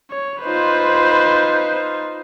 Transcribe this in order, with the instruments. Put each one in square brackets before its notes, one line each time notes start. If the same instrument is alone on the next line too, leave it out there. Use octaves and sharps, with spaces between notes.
[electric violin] C#5
[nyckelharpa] D#4 F4 [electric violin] B4 C5